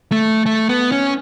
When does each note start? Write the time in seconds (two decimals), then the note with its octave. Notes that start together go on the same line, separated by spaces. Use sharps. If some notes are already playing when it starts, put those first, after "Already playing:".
0.12 A3
0.46 A3
0.69 B3
0.92 C#4